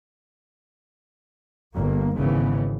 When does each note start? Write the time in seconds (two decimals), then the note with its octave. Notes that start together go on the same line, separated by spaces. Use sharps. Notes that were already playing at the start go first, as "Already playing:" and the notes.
1.75 G1 G2 A#3
2.16 G#1 G#2 C#3 E3 B3